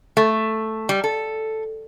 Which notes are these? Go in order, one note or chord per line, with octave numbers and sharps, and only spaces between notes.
A3
G3
A4